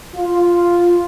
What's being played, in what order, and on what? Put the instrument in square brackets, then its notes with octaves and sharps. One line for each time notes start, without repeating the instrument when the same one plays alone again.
[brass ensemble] F4